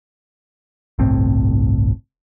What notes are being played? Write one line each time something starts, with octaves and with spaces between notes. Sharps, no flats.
G1 C2 A2 C4